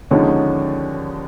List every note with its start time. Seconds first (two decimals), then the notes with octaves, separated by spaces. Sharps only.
0.11 D#2 D3 F3 G#3 C#4 D#4